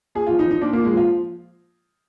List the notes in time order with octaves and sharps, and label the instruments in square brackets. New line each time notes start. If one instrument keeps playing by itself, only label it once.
[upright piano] A#2 G#4
F4
F3
D#4
F3
D#4
A#2 D4
A#3
A#2
G#3
F3 F4